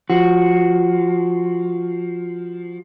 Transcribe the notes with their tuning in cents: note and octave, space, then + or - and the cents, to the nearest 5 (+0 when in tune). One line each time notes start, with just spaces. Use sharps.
F3 +0 F#4 +0